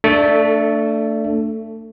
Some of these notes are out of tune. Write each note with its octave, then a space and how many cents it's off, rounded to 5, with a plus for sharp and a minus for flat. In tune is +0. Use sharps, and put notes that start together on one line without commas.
A3 +25 D4 +0 A4 +0